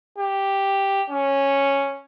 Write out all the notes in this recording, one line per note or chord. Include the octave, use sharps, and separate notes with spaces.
G4
C#4